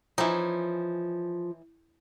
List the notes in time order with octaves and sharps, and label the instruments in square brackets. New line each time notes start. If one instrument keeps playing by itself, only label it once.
[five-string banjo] E3 C#4 D#4 [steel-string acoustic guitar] F3